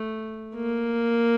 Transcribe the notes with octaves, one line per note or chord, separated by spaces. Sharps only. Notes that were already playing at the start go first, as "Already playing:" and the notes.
Already playing: A3
A#3